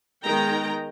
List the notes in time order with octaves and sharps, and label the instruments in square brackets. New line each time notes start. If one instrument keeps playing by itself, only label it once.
[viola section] D#3 G#3 B3 D#5 G5 A#5